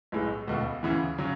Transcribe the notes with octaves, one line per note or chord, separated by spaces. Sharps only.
B1 A2 G#3
C#2 B2 A3
D2 C#3 E3
C#3 F#3